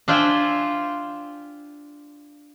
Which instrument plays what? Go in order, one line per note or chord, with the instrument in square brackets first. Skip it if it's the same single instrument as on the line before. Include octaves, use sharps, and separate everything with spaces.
[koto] D4 F4 C5 E5 G5 G#5